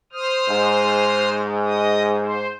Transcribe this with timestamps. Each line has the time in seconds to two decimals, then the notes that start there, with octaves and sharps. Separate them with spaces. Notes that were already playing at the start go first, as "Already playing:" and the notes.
0.13 C5 D#6 F6
0.48 G#2
1.65 D#5 D#6
2.19 C5